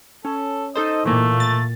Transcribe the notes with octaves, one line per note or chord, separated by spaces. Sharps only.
C#4 A4
D#4 A4 C5 D#5
A#2 E3 A3 A#3
A6